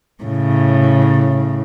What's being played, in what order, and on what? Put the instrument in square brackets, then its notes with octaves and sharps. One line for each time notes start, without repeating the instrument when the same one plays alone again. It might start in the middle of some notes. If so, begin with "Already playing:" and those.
[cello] A2 C#3